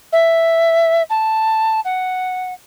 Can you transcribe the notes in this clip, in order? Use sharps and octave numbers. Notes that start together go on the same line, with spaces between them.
E5
A5
F#5